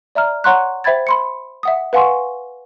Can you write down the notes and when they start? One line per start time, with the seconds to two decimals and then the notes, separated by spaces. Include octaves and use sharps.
0.15 D5 E5 A#5 F6
0.44 C#5 F#5 A#5 C6 C#6 F#6
0.84 C5 E5 G5 B5 G#6 A6
1.07 B5 C6 C#7
1.63 E5 F#5 D#6
1.93 B4 F5 F#5 G#5 C6 C#6